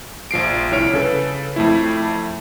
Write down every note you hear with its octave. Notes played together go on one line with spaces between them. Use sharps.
A#1 F3 C7 D7
C2 E4 C#5 F6 D7
C#3 A4 B4
F2 A3 E4